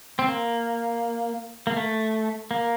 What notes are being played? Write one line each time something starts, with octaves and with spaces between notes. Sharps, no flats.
C4
A#3
A#3
A3
A#3